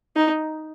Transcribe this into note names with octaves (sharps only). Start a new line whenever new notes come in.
D#4